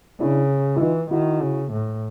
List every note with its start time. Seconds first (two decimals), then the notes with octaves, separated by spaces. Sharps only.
0.20 C#3 D4 E4
0.76 E4
0.80 E3 D#4 F4
1.11 D#3 E4 F#4
1.41 C#3
1.72 A2